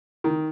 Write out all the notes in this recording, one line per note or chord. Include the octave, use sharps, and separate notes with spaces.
D#3